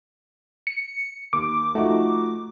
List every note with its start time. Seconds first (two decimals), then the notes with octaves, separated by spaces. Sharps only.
0.67 C#7
1.33 D#2 D6
1.75 F3 A3 D#4 F#4